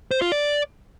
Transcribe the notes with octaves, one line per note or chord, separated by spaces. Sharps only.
C5
F4
D5